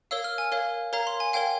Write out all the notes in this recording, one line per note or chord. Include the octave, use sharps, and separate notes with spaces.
A#4 C#5 F5 E6
F6
G#5
A#4 C#5 F5
A#4 C#5 F5 A#5
C6
G#5
A#4 C#5 F5 G5